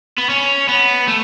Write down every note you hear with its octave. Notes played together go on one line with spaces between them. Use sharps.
B3
C#4
B3
A3